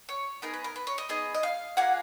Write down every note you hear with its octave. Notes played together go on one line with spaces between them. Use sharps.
C#5
B3 D#4 G#4 A#4
B4
A#4
B4
C#5
D#5
B3 D#4 G#4 D#5
D#5
F5
A#3 F4 G#4 F#5